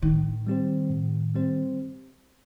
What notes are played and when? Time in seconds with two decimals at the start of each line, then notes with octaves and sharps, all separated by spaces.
0.02 A2 D#3
0.47 G3 C4 G4 C5
0.90 A2
1.35 G3 C4 G4 C5